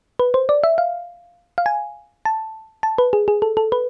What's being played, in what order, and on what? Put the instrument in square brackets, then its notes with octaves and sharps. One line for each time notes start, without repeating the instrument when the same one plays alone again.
[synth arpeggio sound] B4
C5
D5
E5
F5
F5
G#5
A5
A5
B4
G#4
G#4
A4
A4
B4